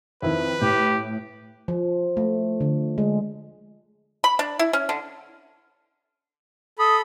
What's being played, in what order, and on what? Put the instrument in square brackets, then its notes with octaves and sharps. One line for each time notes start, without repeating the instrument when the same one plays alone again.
[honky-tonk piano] F2 D#3 E4 [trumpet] B4
[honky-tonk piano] A2 [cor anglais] G4
[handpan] F3
A3
D3
G#3
[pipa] B5
D4
E4
C#4
D3
[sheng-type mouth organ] A4 B5 [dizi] D#6